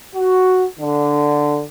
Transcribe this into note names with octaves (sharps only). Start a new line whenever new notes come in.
F#4
D3